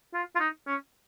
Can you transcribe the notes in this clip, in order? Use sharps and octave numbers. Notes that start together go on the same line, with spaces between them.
F4
F4
D#4
C#4